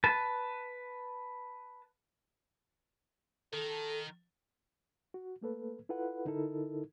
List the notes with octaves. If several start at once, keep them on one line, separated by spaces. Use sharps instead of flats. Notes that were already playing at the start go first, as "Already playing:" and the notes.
B4 A5
D#3 A4
F#4
A3 A#3 A4 B4
E4 F4 A4 B4 F#5
D3 D#4 E4 A4 A#4